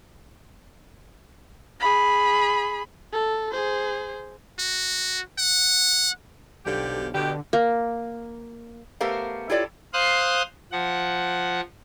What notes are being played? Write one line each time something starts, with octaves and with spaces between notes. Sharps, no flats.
G#4 B5
A4
G#4 C5
F#4
F#5
B1 D3 F3 G4
B2 D3 G4
A#3
A3 B3 G4 A#4 C5 F5
E4 F4 G4 A4 C#5 D5
C5 F5 C6 D#6 F#6
F3 F#5